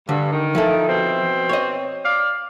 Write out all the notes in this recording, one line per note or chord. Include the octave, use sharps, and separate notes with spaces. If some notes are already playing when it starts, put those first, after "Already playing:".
G2 D3
D#3
F3 E4 A4
B2 C4
C#5 D#5
D5 F5